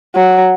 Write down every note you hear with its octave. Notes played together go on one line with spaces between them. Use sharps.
F#3